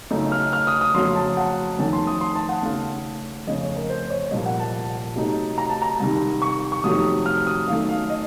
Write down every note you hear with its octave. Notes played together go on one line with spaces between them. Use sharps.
F#2 C#3 A3 D#4
F6
F6
D#6
D#6
F2 C#3 F#3 A3 C6
A5
F#5
F2 D#3 A3 C#4 A5
C6
D#6
C6
A5
F#5
D#2 C#3 A3 F5
F2 C#3 A3 D#5
C#5
A#4
C5
C#5
C2 A#2 F3 A#3 D#5
F#5
A5
C3 F#3 A3 D#4
A#5
A5
A#5
C2 C3 D#3
C#6
C#6
F2 C3 D#3 F#3 A3 D#6
F6
D#6
F#2 D#3 A3 F5
F5
D#5